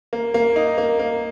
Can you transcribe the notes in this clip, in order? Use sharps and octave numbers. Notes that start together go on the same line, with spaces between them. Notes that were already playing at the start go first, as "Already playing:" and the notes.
A#3
A#3
D#4
A#3
A#3